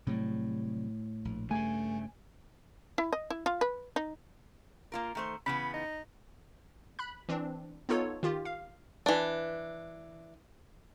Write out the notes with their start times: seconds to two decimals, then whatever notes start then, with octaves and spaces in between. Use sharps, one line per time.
0.07 A2 C3 F#3 G3
1.25 A#1
1.51 G2 C#3 A3 G#5
2.98 E4
3.13 D#5
3.30 E4
3.46 F4
3.61 B4
3.96 D#4
4.92 A#3 F4 A#4
5.15 D#3 A3 C5
5.46 C#3 E3 B3 B5
5.74 D#4
6.99 B5 F#6
7.29 E3 C4 D4
7.89 B3 D#4 F4 A4 C#5
8.23 D#3 F4 G4
8.45 F5
9.06 E3 D4